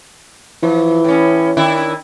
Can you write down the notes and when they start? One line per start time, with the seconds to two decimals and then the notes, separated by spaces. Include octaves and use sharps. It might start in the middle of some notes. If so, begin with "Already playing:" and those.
0.63 E3 F3
1.04 A2 C#4
1.57 D#3 D4 E4